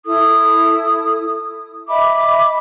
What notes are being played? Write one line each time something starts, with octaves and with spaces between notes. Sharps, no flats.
E4 A4 D#6
D#5 E5 B5 D6